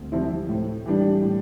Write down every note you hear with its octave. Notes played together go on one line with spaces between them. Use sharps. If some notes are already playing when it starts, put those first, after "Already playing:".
Already playing: D2 C4
C3 F3 C4 E4
A2
E3 G3 D4
A2